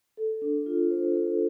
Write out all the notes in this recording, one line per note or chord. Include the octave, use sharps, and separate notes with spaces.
A4
D4
F4
C5
A4